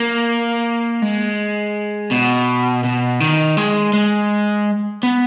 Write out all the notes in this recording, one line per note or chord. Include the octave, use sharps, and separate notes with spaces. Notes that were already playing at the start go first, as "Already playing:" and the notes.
Already playing: A#3
G#3
B2
B2
D#3
G#3
G#3
B3